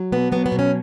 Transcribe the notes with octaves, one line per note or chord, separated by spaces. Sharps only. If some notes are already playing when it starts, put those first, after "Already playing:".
Already playing: F#3
B2 B3
F#3 B3
B3
B2
C#4